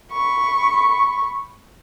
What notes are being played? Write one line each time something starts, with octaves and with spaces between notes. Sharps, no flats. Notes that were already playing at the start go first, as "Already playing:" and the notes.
B5 C#6